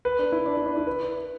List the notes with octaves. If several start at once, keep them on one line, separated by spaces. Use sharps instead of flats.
B4
D4
E4
D4
E4
D4
E4
B4